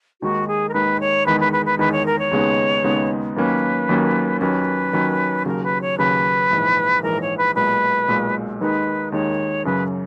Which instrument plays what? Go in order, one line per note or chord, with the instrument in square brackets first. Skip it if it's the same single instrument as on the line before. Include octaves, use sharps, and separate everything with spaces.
[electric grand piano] D#2 D#3 G#3 D#4 [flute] F#4
[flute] G#4
A#4
[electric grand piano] D#2 D#3 G#3 D#4 [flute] B4
[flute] C#5
[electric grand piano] E2 D#3 G#3 D#4 [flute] B4
[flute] B4
B4
B4
[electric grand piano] E2 D#3 G#3 D#4 [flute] B4
[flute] C#5
A#4
C#5
[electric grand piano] D#2 C#3 G#3 B3 D#4
D#2 C#3 G#3 B3 D#4
[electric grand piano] D#2 D#3 F#3 A#3 C#4 [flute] B4
[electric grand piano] D#2 D#3 F#3 A#3 C#4
[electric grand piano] D#2 D#3 F#3 C#4 [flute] B4
[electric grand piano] D#2 D#3 F#3 C#4
[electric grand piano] D#2 C#3 F#3 [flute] A#4
[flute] B4
C#5
[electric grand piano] D#2 C#3 F#3 [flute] B4
[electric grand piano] A#1 G#2 E3
[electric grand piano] A#1 G#2 E3 [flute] A#4
[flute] C#5
B4
[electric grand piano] B1 A#2 G#3 [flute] B4
[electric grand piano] B1 A#2 G#3
[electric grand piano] D#2 D#3 G#3 D#4 [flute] B4
[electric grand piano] D#2 D#3 G#3 D#4 [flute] C#5
[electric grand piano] F#2 C#3 F#3 [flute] B4